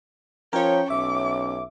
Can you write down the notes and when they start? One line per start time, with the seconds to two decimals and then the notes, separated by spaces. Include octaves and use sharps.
0.53 F3 C#4 F4 A#4 C#5 G5
0.90 B1 E5 D6